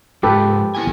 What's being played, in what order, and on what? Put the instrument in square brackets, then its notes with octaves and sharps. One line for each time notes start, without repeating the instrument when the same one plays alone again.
[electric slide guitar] G#2 F3 G#3 [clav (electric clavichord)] G4 A4 B4
[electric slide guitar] B3 E4 G#5